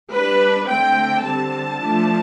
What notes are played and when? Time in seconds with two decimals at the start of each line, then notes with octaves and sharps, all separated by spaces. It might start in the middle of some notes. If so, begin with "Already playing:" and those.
0.12 G3 D4 B4
0.69 D3 A3 C4 G5
1.24 D3 G3 C4 A5
1.79 F3 A3 D4